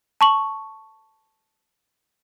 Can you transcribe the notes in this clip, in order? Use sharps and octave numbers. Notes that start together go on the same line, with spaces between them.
A5 C#6 F#7